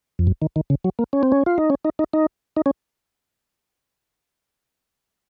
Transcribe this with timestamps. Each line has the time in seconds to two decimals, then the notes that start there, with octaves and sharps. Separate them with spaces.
0.19 F2
0.27 F#2
0.42 D#3
0.56 D#3
0.70 C#3
0.84 F#3
0.99 A#3
1.13 C#4
1.23 C4
1.32 C#4
1.46 F4
1.58 D#4
1.70 C#4
1.85 D#4
1.99 D#4
2.13 D#4
2.56 D#4
2.66 C#4